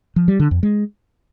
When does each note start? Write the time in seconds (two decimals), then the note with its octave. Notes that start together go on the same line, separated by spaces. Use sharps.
0.16 F3
0.28 G3
0.40 D3
0.51 F2
0.63 G#3